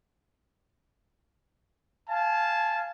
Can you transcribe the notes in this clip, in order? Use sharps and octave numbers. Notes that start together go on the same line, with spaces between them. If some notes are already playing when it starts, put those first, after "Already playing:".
F5 G#5 A5